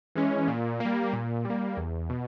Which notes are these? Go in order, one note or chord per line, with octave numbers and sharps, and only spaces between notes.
E3 G#3 C#4
A#2
G3 A#3
A#2
G3 A#3
E2
B2